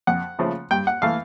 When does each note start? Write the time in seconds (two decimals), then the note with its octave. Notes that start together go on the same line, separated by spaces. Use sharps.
0.07 F2 F#5
0.39 C#3 F3 A3
0.71 G2 G5
0.87 F#5
1.02 E3 A3 F5